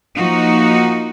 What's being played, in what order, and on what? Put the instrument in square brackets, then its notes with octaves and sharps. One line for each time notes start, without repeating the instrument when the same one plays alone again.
[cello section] F3 A#3 D#4 F#4